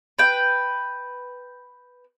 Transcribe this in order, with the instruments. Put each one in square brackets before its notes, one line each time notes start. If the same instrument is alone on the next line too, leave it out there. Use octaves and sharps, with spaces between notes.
[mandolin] B4 G5